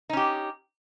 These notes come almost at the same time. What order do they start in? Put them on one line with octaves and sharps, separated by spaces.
D#4 C#4 G4